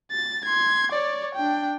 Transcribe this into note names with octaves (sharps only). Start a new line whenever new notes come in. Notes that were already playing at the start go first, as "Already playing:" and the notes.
A6
C6 G#6
C#5 D5
D4 G5